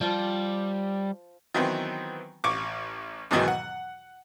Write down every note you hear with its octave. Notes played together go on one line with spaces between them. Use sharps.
F3 G3 F4
D#3 E3 F#3 B3 C4
A1 C#6 D6
E2 G#2 B2 D#3 E3 F#3
F#5